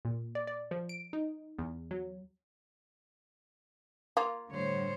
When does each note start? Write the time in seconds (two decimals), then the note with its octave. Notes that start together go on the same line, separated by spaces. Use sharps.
0.05 A#2
0.35 D5
0.47 D5
0.71 F3
0.89 D7
1.13 D#4
1.59 E2
1.91 F#3
4.17 A#3 F4
4.51 A2 D3 G3 C5 C#5